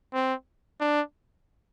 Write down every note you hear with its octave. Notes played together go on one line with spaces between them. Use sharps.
C4
D4